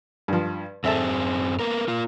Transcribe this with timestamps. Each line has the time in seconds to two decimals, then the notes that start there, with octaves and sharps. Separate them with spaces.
0.28 G2 F3
0.84 F#2 C4 G#4 A4 E5 A5
1.59 A#3 B3 A#4
1.88 A#3 F4